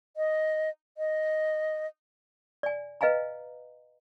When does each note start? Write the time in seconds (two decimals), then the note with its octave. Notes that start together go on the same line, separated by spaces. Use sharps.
0.17 D#5
0.98 D#5
2.63 D5 G#5
3.01 B4 D#5 F5 G#5 A#5